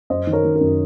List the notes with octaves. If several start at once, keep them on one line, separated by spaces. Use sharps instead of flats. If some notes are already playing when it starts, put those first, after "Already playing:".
F#2 C5 D#5
D#3
A#4 C#5
D#3
A#4
F#2